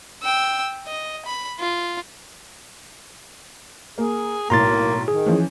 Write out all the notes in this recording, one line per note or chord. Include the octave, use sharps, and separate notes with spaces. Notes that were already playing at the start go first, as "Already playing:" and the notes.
G5 E6
D#5
B5
F4
A#3 G#4
B1 A2 A#3 A#5 C6 A6
D#3 G#4
E3 F3 C#4